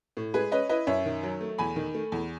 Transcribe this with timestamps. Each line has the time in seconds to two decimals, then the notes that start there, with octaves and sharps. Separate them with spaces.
0.17 A2
0.34 G#3 G#4 B4
0.52 C#4 B4 D#5
0.69 E4 B4 D#5
0.87 F#2 C#5 E5
1.06 D#3
1.23 F#3
1.41 A3
1.58 E2 G#5 B5
1.76 D#3
1.94 A3
2.12 E2